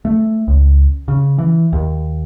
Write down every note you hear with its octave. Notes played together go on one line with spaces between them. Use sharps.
A3
C#2
C#3
E3
D#2